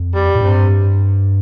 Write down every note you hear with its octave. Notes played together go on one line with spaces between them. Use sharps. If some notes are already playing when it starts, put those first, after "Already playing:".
Already playing: F2
G3
A2
G2 C3